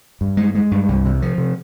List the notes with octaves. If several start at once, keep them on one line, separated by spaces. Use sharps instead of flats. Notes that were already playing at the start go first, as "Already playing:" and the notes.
G2
G#3
G#3
G2
C2
C3
F3
C3